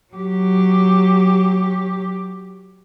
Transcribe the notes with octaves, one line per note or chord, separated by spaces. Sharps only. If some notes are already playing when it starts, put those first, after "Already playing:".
F#3 G4